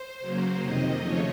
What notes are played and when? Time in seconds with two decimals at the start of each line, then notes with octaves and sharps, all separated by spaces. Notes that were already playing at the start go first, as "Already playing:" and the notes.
Already playing: C5
0.20 C#3 F#3 A#3
0.61 F2 C3 D#3 D#5
1.02 C#3 F3 A3 C#5